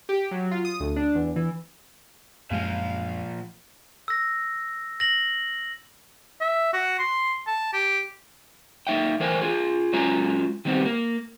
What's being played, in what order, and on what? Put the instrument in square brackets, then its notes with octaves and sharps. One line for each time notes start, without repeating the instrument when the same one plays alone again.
[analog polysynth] G4
F#3
F4
D#6
D2
D4
E2
E3
[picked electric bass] F#2 G#3 [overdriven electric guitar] A#2 F3 [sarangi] F5
[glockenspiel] E6 A#6
A#6 F#7
[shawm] E5
F#4
C6
A5
G4
[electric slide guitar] A#3 D#4 E5 G5
E3 A#4 C5 G5 G#5
F4 G#4
F#3 G#3 C#4 F4 G#5 A#5
D#3 G3 B3 C4 G4
A#3